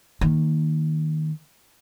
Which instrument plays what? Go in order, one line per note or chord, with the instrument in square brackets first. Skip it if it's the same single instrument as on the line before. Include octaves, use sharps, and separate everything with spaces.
[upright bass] D#3 A#3